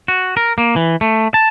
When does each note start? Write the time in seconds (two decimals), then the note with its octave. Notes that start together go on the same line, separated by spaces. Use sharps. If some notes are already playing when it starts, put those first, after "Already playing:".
0.08 F#4
0.37 A#4
0.58 A#3
0.76 E3
1.01 A3
1.34 A5